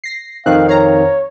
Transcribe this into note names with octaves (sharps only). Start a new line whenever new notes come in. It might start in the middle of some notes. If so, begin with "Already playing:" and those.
A#6 C7
F2 D#3 C4 D#4 F5 F#6
C#5 F5 A#5